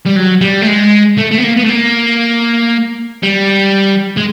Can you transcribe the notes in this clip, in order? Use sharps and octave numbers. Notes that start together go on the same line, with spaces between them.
G3
F#3
G3
A3
G#3
A3
A3
B3
A#3
B3
A3
A#3
G3
G#3